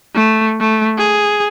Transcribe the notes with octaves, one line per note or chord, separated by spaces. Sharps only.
A3
A3
G#4